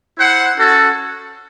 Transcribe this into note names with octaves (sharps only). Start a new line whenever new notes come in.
E4 C5 F#5
C#4 F#4 A4